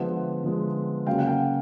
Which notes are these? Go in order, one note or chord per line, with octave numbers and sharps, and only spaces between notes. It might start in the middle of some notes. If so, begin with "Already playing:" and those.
Already playing: D3 F3 G#3 B3 E5 F#5
D3 F3 G#3 B3
C#3 F#3 A#3 C#4 F5 G5
F#5
F5 G5